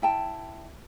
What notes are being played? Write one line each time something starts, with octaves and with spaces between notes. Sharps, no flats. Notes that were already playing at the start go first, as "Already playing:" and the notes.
E4 G5 A5